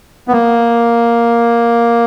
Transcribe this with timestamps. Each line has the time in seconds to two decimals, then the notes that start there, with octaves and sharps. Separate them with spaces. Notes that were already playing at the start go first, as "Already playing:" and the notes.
0.28 B3
0.32 A#3